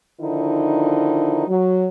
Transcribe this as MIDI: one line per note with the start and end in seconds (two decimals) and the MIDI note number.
0.20 1.44 50
0.20 1.44 51
0.20 1.44 53
0.20 1.44 63
0.20 1.44 64
1.47 1.87 54